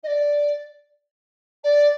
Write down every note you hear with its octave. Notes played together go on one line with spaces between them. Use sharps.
D#5
D5
D5